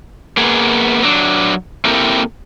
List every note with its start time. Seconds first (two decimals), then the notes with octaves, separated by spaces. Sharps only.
0.37 A#3 B3 G#4
1.03 F#3 D4
1.85 A#3 C4 E4 G4 A4 A#4